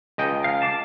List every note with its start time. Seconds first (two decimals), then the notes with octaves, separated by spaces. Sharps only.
0.18 C#2 D#5 G5
0.44 F5
0.62 A5 D6